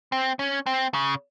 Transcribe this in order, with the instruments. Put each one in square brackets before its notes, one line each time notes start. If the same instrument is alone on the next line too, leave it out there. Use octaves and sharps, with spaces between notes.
[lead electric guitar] C4
C#4
C4
C#3